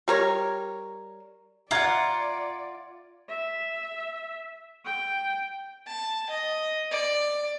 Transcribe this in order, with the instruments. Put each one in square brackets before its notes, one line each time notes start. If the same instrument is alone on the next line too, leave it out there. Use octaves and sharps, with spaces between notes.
[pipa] G3 A#4 C#5
[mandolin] F4 F#5 [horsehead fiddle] D5 [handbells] E5 F6 [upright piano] A#5 G#6
[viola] E5
G5
[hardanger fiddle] A5
D#5
D5